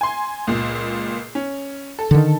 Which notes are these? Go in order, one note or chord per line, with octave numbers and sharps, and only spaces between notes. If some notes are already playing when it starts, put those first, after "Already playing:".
G#5 C6
C#2 A#2
C#4
A4
D3 D#3